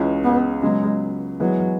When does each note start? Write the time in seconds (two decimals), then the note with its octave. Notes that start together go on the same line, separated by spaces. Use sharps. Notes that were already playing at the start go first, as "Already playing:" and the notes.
Already playing: C#2 C#3 E3 G#3 C#4
0.24 B3
0.62 C#3 F#3 G#3 B3
1.40 E3 F#3 G#3 B3 G#4 B4